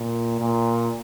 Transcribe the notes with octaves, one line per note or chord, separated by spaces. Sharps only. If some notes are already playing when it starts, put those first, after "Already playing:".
Already playing: A#2
A#2